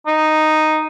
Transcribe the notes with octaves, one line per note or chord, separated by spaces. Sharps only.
D#4